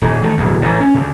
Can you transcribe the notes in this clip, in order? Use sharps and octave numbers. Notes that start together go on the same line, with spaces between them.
D#1 G#2
D#3 G3 A3
D1 B1 E2
A1 G#2
C#4
D2 C#3